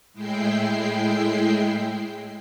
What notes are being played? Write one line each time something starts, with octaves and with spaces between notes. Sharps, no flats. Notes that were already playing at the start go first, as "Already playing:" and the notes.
A2 G#3 E4 G5 C7